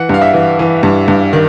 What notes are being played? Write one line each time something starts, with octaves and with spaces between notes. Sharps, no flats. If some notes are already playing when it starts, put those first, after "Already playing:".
Already playing: E3 F#5
G2 F5
E5
E3
E3
G2
G2
D#3